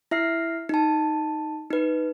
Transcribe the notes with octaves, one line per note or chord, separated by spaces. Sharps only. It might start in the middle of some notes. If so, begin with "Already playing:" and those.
E4 E5 F6 C7
D#4 A5
D#4 B4